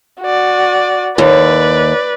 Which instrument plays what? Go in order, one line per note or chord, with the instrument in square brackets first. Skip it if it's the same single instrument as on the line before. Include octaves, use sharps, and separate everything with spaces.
[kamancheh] F#4 D5
[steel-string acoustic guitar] D#2 [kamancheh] B4 D5